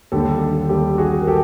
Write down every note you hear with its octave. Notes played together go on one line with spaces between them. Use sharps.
D#2 D3 G3 G4 A4
D#2 D3 G3 G4 A4
F#4 G#4
A#4
G4 A4